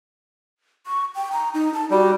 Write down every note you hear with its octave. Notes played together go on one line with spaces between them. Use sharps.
C#6
G5
A#5
D#4
A5
G3 F#4